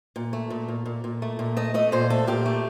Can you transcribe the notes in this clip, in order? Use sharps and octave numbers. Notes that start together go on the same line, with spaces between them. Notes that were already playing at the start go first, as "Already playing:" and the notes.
A#2
A3
A#2
A#2
A#2
A#2
A3
A#2
A3 D#5
A3 D#5
A#2 C5
A3 A4
A#2 G4
A3